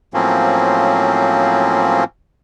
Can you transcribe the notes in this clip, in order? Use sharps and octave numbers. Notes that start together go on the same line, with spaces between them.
A2 F3 F#3 A#3 C4 C#4